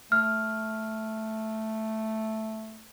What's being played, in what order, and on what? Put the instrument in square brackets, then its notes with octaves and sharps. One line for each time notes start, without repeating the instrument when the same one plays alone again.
[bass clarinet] A3 [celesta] F6